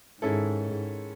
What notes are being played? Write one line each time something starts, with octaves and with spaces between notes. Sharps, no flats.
G#2 D#3 G#3 C#4 E4 A4